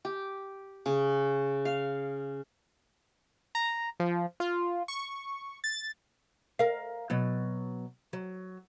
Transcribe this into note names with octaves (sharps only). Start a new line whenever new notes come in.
G4
C#3
F5
A#5
F3
F4
C#6
A6
A#4 F5
B2 F#3
F#3